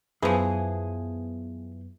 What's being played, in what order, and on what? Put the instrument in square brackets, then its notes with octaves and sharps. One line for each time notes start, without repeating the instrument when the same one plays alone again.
[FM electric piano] F#2 B3 [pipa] E3 F3 [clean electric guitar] G#4 G#5